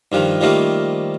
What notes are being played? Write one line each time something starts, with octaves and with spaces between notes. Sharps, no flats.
G2 D#3 F3
D#3 F3 G3 A3 A#3